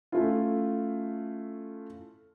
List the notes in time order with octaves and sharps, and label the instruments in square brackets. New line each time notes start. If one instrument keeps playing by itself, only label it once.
[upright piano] A3 C#4 E4 F4